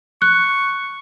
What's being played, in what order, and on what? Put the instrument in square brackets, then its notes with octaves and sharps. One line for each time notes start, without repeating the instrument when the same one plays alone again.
[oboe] C#6 [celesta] F#6